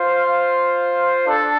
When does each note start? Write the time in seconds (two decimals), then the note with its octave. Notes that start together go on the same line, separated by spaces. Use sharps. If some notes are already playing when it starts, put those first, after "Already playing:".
Already playing: F4 C5 F5
1.27 D4 A4